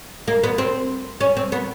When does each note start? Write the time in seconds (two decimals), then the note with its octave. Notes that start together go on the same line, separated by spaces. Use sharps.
0.28 A#3
0.44 B3
0.58 C4
1.21 C#4
1.37 C4
1.52 B3